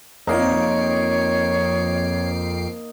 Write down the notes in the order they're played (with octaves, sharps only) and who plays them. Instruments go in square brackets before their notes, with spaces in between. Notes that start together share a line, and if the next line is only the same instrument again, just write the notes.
[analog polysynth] F2 C7 D7 [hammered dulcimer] A#3 D#4 [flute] C#5